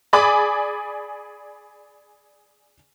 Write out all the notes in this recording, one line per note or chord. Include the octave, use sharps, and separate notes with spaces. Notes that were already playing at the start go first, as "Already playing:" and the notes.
G#4 D5 G#5 B5 D6